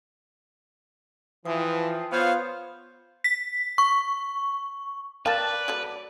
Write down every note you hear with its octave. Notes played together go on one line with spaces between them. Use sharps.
E3 F3 G5 D#6
B3 F4 C5 C#5 F5
B6
C#6
A#4 B4 D5 F5 G5 A5
F#3 A3 A4